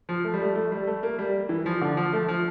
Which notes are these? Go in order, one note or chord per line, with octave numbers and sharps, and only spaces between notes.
F3
A3
G3
A3
A3
G3
A3
A#3
G3
E3
F3
D3
F3
A3
F3